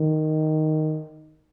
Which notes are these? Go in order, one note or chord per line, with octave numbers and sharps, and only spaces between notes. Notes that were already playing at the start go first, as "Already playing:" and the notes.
Already playing: D#3